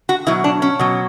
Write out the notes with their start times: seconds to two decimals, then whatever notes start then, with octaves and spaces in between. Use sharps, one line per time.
0.09 F#4
0.27 B2 F#3 E4
0.44 D4
0.62 C#4
0.79 B2 F#3